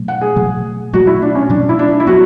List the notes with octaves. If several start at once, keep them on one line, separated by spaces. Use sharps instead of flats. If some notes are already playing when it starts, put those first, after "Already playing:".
Already playing: B2 F#3 A3
F#5
G#4
B2 F#3 A3
B2 F#3 A3 F#4
E4
D4
C#4
B2 F#3 A3 D4
E4
D4
E4
F#3 B3 F#4